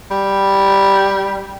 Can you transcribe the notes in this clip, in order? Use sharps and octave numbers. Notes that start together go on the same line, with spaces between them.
G3